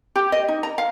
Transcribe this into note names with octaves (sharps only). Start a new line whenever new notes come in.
G4
D#5
D#4
A#5
F5